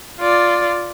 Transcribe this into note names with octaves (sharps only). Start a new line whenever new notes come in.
F4 D5